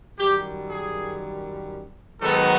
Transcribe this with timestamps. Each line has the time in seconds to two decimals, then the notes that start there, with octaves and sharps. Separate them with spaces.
0.19 F#2 D#3 G3 G4
0.69 G#4
2.21 G#2 D#3 F#3 B3 D#4 A4